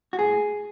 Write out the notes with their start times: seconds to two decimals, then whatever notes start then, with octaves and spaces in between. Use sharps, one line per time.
0.13 F#4
0.19 A2 G#4